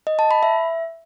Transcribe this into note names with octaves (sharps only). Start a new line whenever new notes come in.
D#5
A5
B5
E5